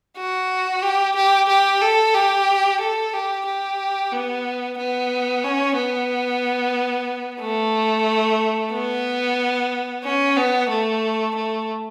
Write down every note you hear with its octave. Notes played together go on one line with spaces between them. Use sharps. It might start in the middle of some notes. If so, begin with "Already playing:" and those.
F#4
G4
G4
G4
A4
G4
A4
G4
G4
B3
B3
C#4
B3
A3
B3
C#4
B3
A3
A3